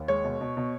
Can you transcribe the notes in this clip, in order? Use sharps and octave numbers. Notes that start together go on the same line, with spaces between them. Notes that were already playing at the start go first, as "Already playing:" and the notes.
Already playing: D#2
G#3 C#5
B2
B2
B2